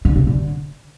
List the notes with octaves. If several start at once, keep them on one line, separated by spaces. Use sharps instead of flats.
D3
C3
D3